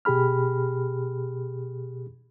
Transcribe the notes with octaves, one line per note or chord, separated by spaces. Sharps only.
B2 G4 G#4 B5 F6